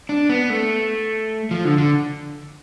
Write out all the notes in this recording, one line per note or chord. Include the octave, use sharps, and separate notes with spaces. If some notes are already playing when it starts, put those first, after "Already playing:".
D4
B3
A3
F3
D3
D3